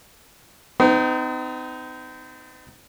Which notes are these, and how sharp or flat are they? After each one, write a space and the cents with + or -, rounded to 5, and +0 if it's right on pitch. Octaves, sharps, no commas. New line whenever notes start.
C4 -45 D#4 +0